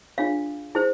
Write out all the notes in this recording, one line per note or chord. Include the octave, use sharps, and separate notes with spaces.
D4 F4 G#4 C#5 F5
E4 G#4 C5